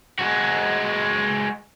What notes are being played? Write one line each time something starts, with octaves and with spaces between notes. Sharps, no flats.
G#3 F#4